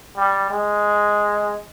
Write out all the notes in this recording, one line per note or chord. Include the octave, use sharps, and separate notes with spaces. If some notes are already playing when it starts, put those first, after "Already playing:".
G3
G#3